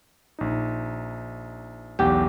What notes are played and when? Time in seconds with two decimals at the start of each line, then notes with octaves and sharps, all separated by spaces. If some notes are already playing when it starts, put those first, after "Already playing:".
0.39 A#1 D#4
1.99 B1 E2 G4 F#5